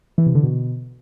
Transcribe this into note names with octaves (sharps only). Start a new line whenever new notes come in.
E3
C3
D3
B2